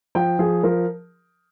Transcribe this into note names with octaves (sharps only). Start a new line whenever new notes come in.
F3 G5
F3 G#4
F3 A#4